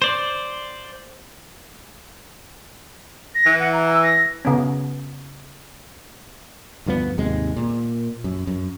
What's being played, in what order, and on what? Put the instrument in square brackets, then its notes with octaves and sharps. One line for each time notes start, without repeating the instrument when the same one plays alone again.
[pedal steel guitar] C5 D5
[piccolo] A#6
[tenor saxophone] E3
[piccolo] F#5
A#5
E6
A#6
[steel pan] C#3 B3 C#4
[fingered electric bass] D2 G2 F3 B3
D#2 G#2 C3 G#3
A#2
F#2
F#2